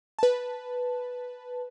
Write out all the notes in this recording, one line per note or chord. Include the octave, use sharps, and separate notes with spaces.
B4 A5